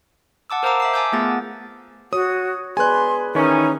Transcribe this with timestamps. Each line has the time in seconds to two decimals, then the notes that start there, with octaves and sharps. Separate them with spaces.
0.50 F#5 A5 D6 E6
0.63 A#4 C5 F5 A#5 D6 E6
0.80 E5 D6 C7
0.94 G#5 A5 D6 E6 G6
1.12 A3 B3 F4 G#4 F#5 A6
2.13 F#4 C#5 D#6
2.77 G#4 B4 D5 G#5 C6 F#6
3.35 D#3 E3 C#4 D#4